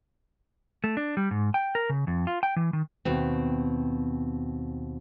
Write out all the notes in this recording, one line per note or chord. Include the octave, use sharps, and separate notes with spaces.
A3
D4
G3
G#2
G5
A#4
C#3
F2
F4
G5
E3
D#3
D#2 B2 C4